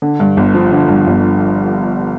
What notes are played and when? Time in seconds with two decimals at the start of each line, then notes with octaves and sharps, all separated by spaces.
0.02 D3
0.20 G2
0.37 G1
0.54 F3
0.72 D3
0.89 G2
1.07 G1